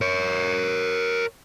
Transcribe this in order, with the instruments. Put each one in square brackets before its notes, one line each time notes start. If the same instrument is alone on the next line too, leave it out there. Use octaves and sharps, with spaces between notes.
[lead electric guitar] A#4 C#5